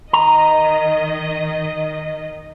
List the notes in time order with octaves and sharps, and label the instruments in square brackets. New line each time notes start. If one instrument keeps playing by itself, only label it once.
[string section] D#3 D#5 [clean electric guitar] A#5